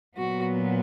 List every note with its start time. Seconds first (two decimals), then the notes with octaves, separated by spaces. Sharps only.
0.17 A#2 F#3 B3 F#4